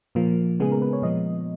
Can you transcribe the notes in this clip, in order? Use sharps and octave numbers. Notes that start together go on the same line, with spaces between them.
A#2 F3 A#3
C#3 G#3 B3 G#4
A#4
B4
C#5
A#2 F3 G#3 B3 D#5